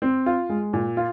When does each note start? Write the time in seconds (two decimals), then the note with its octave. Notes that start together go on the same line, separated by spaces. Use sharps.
0.02 C4
0.26 F4
0.49 G#3
0.73 A#2
0.97 F4